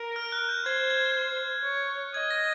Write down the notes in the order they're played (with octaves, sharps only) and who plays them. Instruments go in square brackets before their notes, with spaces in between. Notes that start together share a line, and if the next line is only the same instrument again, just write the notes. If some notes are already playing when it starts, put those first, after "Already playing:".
Already playing: [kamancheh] A#4
[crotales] F6
F#6
G6
[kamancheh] C5 [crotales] G#6
[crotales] G#6
[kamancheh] C#5
[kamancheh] D#5 [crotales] G#6
[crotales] A#6